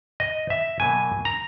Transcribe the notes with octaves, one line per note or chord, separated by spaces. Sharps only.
D#5
E5
B2 F#3 A#3 G#5
A#5